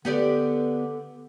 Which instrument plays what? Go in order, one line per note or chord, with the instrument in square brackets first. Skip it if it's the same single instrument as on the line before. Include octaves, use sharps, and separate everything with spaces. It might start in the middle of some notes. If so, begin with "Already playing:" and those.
[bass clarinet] D3 [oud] B3 G4 D5